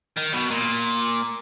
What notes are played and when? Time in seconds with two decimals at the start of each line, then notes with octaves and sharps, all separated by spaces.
0.17 D#3
0.33 B2
0.51 A#2